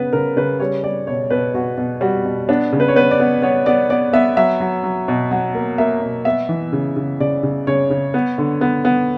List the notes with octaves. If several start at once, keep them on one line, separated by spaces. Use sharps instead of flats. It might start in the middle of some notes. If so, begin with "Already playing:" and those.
Already playing: C#3 B3 B4
C#3 A#4
C#3 B4
G3 C#5
G3 D5
B2 C#5
B2 B4
B2 F#4
B2
G3 F#4
B2
B3 D4
C#3
B4
C#5
B3 B4
D5
B3
B3 C#5
B3 D5
B3 D5
B3 E5
F#3 E5
F#3
F#3
B2
F#3 F#5
A#3
A#3 E5
B2
B3 E5
E3
C#3
C#3
C#3 D5
C#3
C#3 C#5
C#3
B3
D3
B3
B3